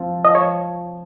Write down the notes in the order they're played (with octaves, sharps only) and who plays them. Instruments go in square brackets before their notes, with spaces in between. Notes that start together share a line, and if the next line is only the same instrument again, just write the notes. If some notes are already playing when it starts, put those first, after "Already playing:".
Already playing: [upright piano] F3 C4 F4
[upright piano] F3 [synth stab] D#5
[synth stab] C#5